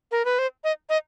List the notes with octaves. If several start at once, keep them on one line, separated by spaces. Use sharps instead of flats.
A#4
B4
C5
D#5
D#5